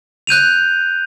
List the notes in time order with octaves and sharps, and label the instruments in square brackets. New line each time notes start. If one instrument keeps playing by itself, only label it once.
[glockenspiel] F#6 G6 D#7 F7